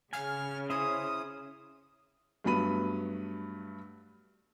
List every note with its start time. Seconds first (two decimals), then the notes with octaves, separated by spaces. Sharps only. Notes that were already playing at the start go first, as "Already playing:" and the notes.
0.13 C#3 G#5 F6
0.70 C#4 E4 C5 D#6
2.44 G2 F#3 A3 B3 B5 D#7